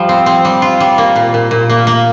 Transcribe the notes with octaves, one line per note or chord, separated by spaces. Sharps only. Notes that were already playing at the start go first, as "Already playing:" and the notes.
Already playing: F3 G3
C4
C4
G3
F4
G3
A#3
A#2
A#2
A#2
A#3
A#3